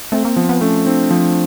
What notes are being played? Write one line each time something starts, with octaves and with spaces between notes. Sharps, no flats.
A3 C4
A#3
F3 B3
B3
A3 C#4
C4 D4
F3